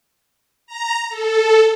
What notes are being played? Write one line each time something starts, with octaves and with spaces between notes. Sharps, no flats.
A#5
A4